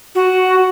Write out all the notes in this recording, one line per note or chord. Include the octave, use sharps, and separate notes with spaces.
F#4